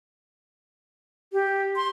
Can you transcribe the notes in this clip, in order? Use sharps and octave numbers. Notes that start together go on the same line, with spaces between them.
G4
C6